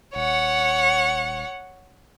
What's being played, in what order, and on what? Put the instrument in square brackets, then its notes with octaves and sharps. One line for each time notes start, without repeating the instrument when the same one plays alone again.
[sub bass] D#1 [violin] C#5 F#5